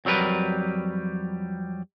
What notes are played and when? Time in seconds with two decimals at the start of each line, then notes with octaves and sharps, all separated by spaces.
0.05 F2 F#3 G3 A#4 B4